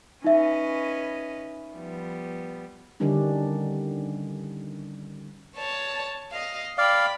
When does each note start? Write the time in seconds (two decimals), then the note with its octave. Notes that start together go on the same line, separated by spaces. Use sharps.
0.24 C#4 D#4 B4 D#5 E5
1.72 F3 G3 B3
3.00 D3 D#3 G3 C#4 D4
5.57 C#5 A5
6.32 D#5 F5
6.78 D5 F5 G5 B5